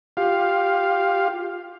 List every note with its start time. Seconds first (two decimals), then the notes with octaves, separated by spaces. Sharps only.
0.17 F4 G4 F5